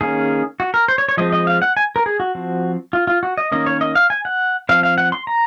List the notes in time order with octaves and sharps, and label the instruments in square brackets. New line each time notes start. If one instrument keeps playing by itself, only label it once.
[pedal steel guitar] D#3 A#3 C#4 G#4
F#4
A#4
C5
C#5
C#5
F3 G#3 C4 D#5
D#5
F5
F#5
G#5
A#4
G#4
F#4
F3 C4
F4
F4
F#4
D#5
D#3 A#3 C#4 D#5
C#5
D#5
F5
G#5
F#5
F3 C4 F5
F5
F#5
C6
A#5